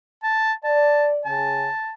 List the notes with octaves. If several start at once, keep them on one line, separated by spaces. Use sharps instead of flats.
A5
D5 A5
C#3 G#5 A5